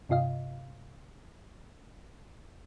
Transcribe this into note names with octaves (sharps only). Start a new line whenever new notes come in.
G2 C3 F4 D#5 F5